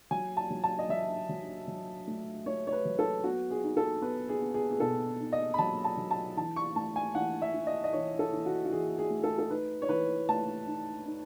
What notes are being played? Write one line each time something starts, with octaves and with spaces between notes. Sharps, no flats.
F#3 G#5
A5
F#3
A5
D#5
F#3 E5
F#3
F#3
A3
A3 C#5
C#5
B4
F#3
A4
B3 F#4
G#4
D#4
A4
B3 B4
G#4
B3
G#4
G#4
B2 A4
D#4
D#5
B5
F#3 A5
A5
F#3
A5
E3 A5
C#6
A3 A5
G#5
E3 F#5
E5
E4
D#5
D#5
E3 C#5
A4
E3
F#4
F#4
E3 G#4
G#4
A3
A4
A4
D#4 B4
C#5
E3 B4
A3 A5
D#4
D#4